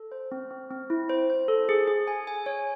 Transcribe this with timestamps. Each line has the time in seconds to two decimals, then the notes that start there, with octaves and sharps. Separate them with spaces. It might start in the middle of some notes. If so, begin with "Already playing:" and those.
Already playing: A4
0.12 C5
0.32 C4
0.51 C4
0.71 C4
0.90 E4
1.09 C5
1.30 C5
1.48 A4
1.69 G#4
1.88 G#4
2.08 G#5
2.27 G#5
2.46 C#5